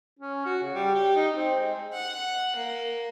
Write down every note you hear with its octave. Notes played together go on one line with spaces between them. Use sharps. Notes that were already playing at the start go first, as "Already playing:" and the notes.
C#4
F#4
C#3
G3
G4
D#4
C4
G#3
F#5
A#3